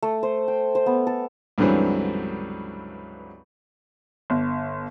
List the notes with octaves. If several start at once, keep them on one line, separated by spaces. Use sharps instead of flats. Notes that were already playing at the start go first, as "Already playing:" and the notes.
A3
C5
G5
C5
B3
A4
C#2 G2 D3 E3 F#3 C4
G1